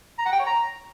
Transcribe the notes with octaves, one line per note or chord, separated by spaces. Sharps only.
A#5
F#5
G5
C#5
A#5